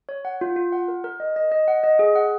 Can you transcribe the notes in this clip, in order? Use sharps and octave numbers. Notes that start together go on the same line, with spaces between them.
C#5
F#5
F4
F4
F#5
A#4
A#4
D#5
D#5
D#5
F#5
D#5
G#4
F#5